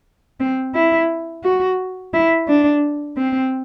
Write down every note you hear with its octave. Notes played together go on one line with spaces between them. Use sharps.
C4
E4
F#4
E4
D4
C4